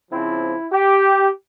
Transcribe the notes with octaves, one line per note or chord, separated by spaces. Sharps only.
C#3 F3 C4 E4
G4